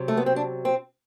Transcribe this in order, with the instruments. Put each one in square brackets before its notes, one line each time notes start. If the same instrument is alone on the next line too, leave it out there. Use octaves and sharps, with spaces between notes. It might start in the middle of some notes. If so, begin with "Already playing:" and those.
Already playing: [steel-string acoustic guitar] C3 F#3
A3
B3
C4
D4
C4